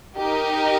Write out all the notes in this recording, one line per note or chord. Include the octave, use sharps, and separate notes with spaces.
D#4 G4 A#4 D#5